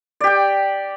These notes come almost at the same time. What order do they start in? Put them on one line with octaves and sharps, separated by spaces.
D5 G4 G5